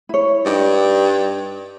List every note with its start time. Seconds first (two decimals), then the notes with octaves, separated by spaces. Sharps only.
0.09 E4 C#5
0.46 G2 D#4 D5 G5